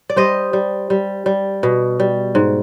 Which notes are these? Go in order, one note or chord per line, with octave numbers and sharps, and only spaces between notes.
D5
G3 C5 D#5
G3
G3
G3
B2
G3
G#2